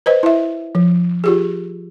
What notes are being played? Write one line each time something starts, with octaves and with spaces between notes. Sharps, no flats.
B4 C5 D#5
E4 E5
F3
F4 G4 G#4